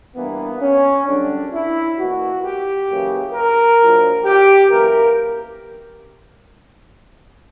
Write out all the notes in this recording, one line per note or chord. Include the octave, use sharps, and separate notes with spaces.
G2 E3 A#3 B3
C#4
F#2 D3 G3 D4
E4
E2 B2 A#3 F#4
G4
F#2 C#3 E3 A#3
A#4
A#1 A#2 F#3
G4
F#2 E3 A#3 A#4